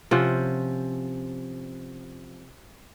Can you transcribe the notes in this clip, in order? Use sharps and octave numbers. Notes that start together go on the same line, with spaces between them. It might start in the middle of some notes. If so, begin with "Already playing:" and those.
C3 F3 C#4 F#5